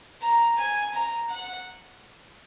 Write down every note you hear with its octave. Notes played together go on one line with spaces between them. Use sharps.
A#5
G#5
A#5
F#5